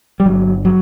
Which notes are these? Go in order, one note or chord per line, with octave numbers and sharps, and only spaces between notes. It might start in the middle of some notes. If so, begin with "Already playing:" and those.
G3
G1 F#3
F#3